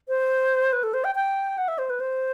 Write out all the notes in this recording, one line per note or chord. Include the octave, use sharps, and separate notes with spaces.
C5
B4
A4
C5
G5
G5
F#5
E5
C5
B4
C5